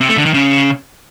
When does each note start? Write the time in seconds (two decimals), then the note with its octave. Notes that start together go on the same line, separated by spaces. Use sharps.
0.01 C3
0.09 A3
0.17 D3
0.26 D#3
0.34 C#3